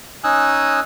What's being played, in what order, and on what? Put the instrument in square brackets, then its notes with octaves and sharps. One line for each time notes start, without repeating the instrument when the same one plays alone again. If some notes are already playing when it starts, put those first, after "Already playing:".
[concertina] C#4 D#4 G#5 D#6 E6 F#6